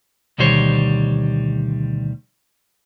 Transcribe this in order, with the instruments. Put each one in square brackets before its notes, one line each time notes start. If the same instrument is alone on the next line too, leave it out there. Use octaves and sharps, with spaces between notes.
[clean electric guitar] D2 B2 D#3 G3 C5 C#5